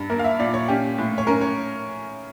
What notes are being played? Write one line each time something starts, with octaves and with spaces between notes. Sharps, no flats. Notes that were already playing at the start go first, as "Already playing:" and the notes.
Already playing: G2
A#3 A#4
F5
E5
A#2 D5
C#5
C#4 G4
A2
C#5
C#4 A#4
C#5